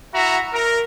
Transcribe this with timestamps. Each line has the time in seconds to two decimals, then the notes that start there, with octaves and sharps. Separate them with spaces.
0.14 E4 F#4 E5 A#5
0.53 A#4